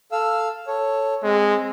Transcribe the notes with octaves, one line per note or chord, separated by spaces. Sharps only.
A4 F5 E6
A4 C#5
G#3 C4